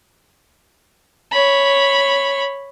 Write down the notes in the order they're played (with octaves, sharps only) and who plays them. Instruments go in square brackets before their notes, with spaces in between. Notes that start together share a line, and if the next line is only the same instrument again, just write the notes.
[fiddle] C#5 B5